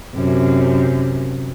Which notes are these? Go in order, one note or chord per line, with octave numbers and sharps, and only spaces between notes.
F#2 C3